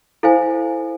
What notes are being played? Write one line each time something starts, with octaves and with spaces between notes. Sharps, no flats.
E4 A4 C5 F5 G#5